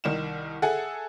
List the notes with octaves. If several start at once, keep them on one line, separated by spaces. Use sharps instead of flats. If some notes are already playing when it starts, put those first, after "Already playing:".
C2 D#3 E7
G#4 A4 E5 F#5 G#5